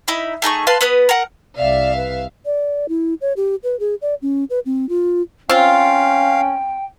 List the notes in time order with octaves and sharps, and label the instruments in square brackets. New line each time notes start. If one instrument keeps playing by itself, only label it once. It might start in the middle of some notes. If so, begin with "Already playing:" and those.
[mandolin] D#4 E4 B5
A3 D#4 G#4 C#6
B4 F5 A5 C6
B3 B4 D#6
A#4 F#5
[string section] C2 E5 F5 [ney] D5
[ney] B4
[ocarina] D5
E4
C#5
G4
B4
G#4
D5
C#4
B4
C4
F4
[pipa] C4 F4 [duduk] C#4 [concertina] F5 [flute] G5